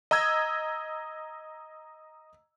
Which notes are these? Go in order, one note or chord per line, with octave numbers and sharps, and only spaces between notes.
D#5 A#5 E6 G#6